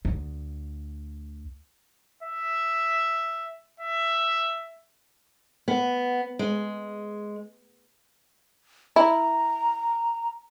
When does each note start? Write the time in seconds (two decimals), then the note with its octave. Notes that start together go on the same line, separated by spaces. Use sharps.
0.05 D2
2.23 E5
3.80 E5
5.68 B3
6.39 G#3
8.96 E4 A#5